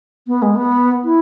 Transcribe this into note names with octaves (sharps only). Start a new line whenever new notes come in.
B3
G#3
B3
E4